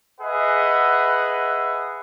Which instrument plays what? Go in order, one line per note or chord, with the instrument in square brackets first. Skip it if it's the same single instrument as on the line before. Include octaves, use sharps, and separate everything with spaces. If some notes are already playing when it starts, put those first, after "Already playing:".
[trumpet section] G#4 B4 D#5 E5 F#5